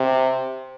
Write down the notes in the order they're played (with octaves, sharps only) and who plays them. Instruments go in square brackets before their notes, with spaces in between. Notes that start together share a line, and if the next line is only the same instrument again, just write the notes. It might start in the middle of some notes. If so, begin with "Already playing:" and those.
Already playing: [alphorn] C3